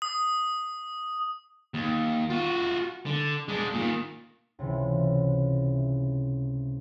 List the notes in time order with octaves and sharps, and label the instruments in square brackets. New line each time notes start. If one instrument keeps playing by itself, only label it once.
[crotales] D#6
[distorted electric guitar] D#2
F4 F#4
D3
G#3 D4
A#2 D#3
[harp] C#2 C3 E3